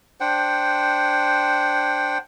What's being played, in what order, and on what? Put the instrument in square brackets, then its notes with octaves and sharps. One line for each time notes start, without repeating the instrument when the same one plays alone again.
[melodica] D4 C5 F#5 G5